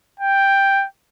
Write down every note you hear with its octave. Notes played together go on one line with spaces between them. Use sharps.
G5